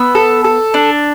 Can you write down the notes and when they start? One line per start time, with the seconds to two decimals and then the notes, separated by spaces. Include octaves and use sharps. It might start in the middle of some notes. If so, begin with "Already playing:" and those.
Already playing: B3 E6
0.15 A4
0.44 A4
0.74 D4